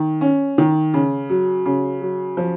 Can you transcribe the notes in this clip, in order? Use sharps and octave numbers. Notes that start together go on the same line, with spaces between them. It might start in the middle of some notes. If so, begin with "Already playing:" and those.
Already playing: D#3
C#4
D#3
C#3
F#3
C#3
F#3
F3